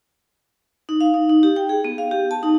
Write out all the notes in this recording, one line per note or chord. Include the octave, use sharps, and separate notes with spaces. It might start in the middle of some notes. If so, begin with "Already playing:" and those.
D#4
F5
D#4
D#4
G4
G5
G#4
B3
F5
G4
A5
D#4